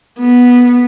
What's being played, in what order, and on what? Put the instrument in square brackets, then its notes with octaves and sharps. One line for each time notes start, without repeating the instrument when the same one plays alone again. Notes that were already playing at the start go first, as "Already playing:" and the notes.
[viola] B3